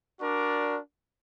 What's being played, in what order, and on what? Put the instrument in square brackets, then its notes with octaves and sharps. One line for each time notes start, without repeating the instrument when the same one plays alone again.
[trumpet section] D4 F#4 A#4 D5